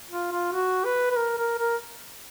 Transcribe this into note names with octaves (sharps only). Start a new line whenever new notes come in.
F4
F4
F#4
B4
B4
A#4
A#4
A#4